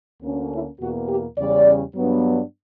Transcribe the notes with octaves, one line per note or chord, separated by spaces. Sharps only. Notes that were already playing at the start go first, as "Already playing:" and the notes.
D2 D3 A#3 C#4
E4
E2 B2 A#3 F#4
G4
E2 C#3 G3 C#4 D5
G2 F#3 B3 D4